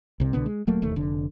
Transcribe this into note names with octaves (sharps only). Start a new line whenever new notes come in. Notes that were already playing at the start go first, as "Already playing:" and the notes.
C2 C3
C2 B2 D3 B3
G#3
D#1 F#3 A3 A#3
E1 D#2 A3
F1 D3